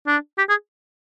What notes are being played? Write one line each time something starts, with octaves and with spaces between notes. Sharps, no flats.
D4
G4
G#4